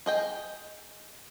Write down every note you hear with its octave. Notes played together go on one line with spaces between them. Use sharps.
G#4 D#5 G5